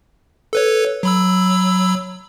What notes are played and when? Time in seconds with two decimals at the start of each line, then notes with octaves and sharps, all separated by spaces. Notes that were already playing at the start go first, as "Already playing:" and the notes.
0.53 A4 B4 C#5
1.03 F#3 B5 E6